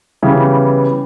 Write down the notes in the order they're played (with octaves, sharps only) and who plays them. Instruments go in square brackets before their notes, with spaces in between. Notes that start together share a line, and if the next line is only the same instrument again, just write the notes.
[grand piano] C#3 E3 G3 B3